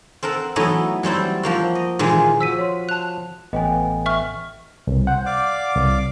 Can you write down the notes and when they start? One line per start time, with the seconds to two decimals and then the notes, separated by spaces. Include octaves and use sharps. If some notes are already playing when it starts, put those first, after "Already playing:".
0.23 C4 A4 A#4 F#5
0.56 E3 F#3 A3 B3 D#4 D#5
1.03 F#3 G3 C4 E4
1.43 F3 A#3 F#4
1.75 D#5
1.99 A#2 D#3 E3 G#3
2.41 F3 F#4 E6 B6 D#7
2.58 C#5 C6
2.89 A5 F#6 F7
3.53 A1 B3 D#5 G5 G#5
4.06 E5 C#6 F6
4.87 C2
5.07 C5 F#5
5.26 D5 F5 D6
5.76 C2